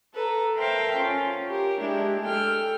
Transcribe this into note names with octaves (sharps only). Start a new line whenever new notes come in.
A4 B4 A#5
A#4 C5 E5 F5 G5 A5
C#4 F4
G4 A#4
G#3 D4 E4 G4
A4 G5 F6